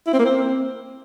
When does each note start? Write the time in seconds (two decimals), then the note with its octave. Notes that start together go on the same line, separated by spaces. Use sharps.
0.07 E4
0.13 C4
0.19 A#3
0.25 C4